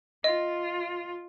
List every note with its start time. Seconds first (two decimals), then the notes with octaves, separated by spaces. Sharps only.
0.24 F4 D#5